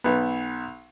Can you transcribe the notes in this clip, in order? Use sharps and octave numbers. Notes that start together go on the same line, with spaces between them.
B1 B3